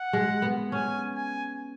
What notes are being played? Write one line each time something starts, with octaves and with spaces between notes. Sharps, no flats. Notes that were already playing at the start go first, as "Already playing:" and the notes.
Already playing: F#5
G#3
B3
C#4 G#5
G#5